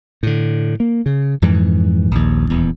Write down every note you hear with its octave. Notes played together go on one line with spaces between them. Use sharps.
A2 D3
A#3
C#3
F2 G#2 E3
A#1 D#2
D#1 E2